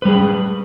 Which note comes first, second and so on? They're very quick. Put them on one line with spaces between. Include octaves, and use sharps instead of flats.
B4 G3 G#4